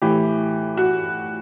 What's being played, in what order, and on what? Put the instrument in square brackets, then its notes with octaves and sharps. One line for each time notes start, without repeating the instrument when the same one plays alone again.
[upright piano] A2 E3 G4
F#4